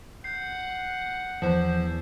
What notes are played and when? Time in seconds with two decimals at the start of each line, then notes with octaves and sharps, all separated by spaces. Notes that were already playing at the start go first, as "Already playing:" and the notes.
0.24 F#5 G6 C7
1.42 E2 F3 B4 C5